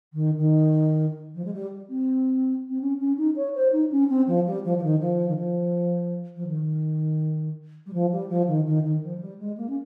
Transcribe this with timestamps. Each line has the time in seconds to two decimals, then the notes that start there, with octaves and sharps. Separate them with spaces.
0.13 D#3
0.37 D#3
1.34 F3
1.44 G#3
1.53 G3
1.89 C4
2.69 C4
2.81 C#4
2.99 C#4
3.17 D#4
3.36 C#5
3.55 C5
3.72 D#4
3.91 C#4
4.09 C4
4.27 F3
4.46 G3
4.64 F3
4.77 F3
4.83 D#3
5.00 F3
5.28 D#3
5.37 F3
6.36 F3
6.46 D#3
7.86 G3
7.93 F3
8.11 G3
8.29 F3
8.47 D#3
8.66 D#3
8.84 D#3
9.03 F3
9.17 G#3
9.20 G3
9.39 G#3
9.57 A#3
9.69 C#4